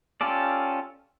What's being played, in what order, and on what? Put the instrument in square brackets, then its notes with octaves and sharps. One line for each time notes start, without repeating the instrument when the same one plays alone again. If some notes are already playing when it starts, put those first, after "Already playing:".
[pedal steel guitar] C#4 F4 G4 A4 D5